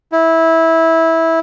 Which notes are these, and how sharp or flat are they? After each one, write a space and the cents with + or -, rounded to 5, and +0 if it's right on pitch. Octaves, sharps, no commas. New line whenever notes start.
E4 -15